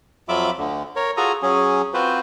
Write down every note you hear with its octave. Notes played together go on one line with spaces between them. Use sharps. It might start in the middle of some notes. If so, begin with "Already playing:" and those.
F2 F#3 F4 E5 B5 D6
D2 D3
A#4 C#5
F4 F#4 G#4 A4 G#5 A#5
F#3 C#4 G#4
C4 F4 F#4 B4 C5